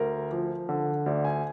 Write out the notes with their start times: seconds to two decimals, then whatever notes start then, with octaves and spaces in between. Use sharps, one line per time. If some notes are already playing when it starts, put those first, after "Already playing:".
Already playing: D2 A#4
0.31 F3
0.69 D3
1.06 D2 D5
1.25 G#5